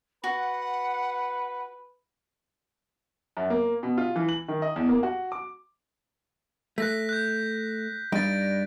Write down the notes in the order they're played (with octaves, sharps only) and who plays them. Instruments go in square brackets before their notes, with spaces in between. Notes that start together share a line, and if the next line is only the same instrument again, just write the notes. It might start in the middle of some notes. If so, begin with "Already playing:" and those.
[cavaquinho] F#4 [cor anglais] B4 [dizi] F#5
[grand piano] F#2
A#3
B2
F4
E3
F#7
D#3
D#5
E2
A#3
F#4
D6
[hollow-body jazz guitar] A3 [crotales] F#6 A#6 B6
[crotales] F#6 G6
[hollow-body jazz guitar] G2 G3 D#4 [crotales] A6 D7